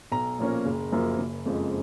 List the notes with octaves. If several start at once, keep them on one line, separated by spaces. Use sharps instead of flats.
B1 A#5
A#2 F3 A#3 C#4
F#1
F#2 F3 A#3
F#1
F2 C#3 F3 G#3